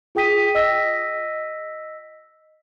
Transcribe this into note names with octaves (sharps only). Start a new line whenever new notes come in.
F4 G#4 G5 D#6 B6 D#7
D#5 E6 A#6 B6